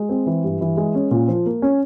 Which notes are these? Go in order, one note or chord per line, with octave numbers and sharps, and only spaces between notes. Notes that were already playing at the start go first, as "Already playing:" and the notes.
Already playing: G#3
C4
E3
G2
E3
G#3
C#4
A#2
F3
A#3
C#4